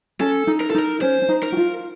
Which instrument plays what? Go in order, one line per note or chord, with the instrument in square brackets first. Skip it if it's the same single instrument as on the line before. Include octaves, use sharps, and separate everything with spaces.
[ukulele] C#4 [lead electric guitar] A4
[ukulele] D#4
[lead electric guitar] A#4
A4
[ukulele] D#4 [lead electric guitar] A#4
[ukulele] C#4 [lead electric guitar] C5
[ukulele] C#4
D#4
[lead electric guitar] A#4
[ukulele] F#4
F4